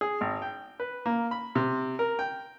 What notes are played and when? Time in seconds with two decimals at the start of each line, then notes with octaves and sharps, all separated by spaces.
0.01 G#4
0.21 G#1
0.42 G5
0.80 B4
1.06 A#3
1.31 B5
1.55 C3
1.99 A#4
2.19 G5